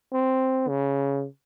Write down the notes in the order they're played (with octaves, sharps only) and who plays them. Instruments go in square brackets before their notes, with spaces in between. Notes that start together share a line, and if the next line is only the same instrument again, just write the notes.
[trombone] C4
C#3